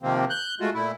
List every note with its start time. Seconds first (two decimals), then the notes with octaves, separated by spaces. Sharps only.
0.03 C3 D#3 F3 A#3 C4
0.30 F#6 G6
0.60 G#3 A3 F4 F#4
0.74 A#2 A3 E4